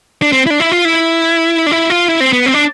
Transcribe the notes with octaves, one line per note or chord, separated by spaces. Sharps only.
D4
C4
E4
D4
E4
F4
E4
D4
E4
F4
E4
C4
B3
C4
D4